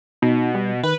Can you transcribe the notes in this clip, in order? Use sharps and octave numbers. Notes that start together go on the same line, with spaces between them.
B2 D#4
G3
D#3 B4